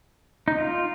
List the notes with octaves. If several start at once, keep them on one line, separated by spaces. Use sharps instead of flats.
D#4
F4